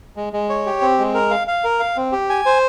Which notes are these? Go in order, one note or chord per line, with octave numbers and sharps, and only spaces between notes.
G#3
G#3
C#5
G4
C4
G#3
A#4
F5
F5
A#4
F5
C4
G4
G#5
C5